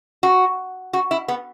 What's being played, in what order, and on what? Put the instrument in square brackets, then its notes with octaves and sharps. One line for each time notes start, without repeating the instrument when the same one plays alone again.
[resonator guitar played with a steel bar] F#4
F#4
E4
B3